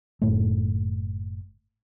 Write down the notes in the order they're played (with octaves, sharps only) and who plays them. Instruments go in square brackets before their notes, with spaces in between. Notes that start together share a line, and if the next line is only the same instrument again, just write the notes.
[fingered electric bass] F#1 C#2 A2 A3